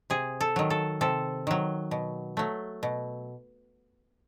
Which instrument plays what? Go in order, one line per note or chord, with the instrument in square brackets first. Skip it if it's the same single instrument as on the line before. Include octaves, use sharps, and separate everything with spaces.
[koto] C3 G#4
A4
D#3 F#3
A4
C3 A4
D#3 F#3
B2
F#3 A3
B2